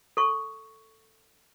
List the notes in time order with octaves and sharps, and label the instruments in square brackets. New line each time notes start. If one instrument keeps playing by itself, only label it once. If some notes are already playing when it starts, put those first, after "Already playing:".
[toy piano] A4 C#6